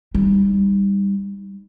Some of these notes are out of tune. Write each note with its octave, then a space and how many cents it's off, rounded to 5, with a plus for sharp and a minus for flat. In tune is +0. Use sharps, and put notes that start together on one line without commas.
G3 +15 D#4 +0